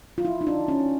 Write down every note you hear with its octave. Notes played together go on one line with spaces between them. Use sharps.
F4
E4
D#4
D4
C#4